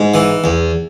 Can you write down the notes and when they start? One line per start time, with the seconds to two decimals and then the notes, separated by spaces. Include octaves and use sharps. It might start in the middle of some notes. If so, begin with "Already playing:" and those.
Already playing: G#2
0.14 E3
0.44 E2